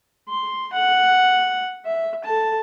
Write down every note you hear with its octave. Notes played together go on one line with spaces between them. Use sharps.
C6
F#5
E5
A4 A5